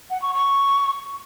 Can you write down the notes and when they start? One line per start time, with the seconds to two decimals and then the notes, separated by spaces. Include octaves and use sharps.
0.10 F#5
0.21 C#6
0.33 C#6